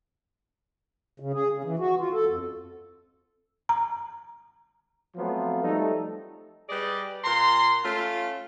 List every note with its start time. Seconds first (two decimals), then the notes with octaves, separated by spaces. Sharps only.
1.20 C#3
1.33 G#4
1.51 C#3
1.63 E3
1.79 F#4
1.99 F4
2.13 A4
2.28 F2
3.69 A#5
5.16 F3 F#3 A3 B3 C4 F4
5.64 F3 G3 A3 D#4 A4
6.69 G3 G#4 B4 D5 D#5
7.24 A#2 A#5 C6
7.84 A3 C#4 F4